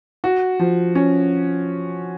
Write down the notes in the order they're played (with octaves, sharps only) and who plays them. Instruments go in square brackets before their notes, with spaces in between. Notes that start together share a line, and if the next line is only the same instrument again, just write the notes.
[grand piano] F#4
F3
C#4